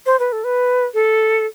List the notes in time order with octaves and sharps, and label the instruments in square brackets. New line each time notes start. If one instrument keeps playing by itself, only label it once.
[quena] C5
B4
A4
B4
[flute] A4